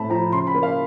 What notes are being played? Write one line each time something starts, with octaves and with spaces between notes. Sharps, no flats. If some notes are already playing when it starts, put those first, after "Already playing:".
Already playing: A2 A3 C4 A5 B5
F3 A#5
C#3 C6
B5
A#3
F5